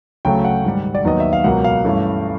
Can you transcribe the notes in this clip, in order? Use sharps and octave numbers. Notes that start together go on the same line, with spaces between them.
D2 C#3 F#3 A3 G5
F#5
G#2 D#3 G3
D5
D#2 D#3 F#3 B3 D#5
E5
F5
C#2 B2 F#3 A#3 F#5
F5
G2 E3 A3 C#4